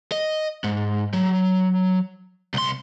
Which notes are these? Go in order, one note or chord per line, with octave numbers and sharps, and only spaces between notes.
D#5
G#2
F#3
C2 C6